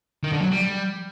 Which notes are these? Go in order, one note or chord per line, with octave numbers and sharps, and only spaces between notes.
D#3
D3
F#3
G3